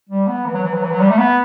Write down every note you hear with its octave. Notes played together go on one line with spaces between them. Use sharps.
G3
B3
E3
F#3
E3
F#3
E3
F#3
G3
A3
B3